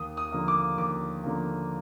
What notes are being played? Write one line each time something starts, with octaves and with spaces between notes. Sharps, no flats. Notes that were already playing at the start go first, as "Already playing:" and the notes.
Already playing: D#2 D#6
D#6
D3 F3 A#3
D6
D#2 D6
D3 F3 A#3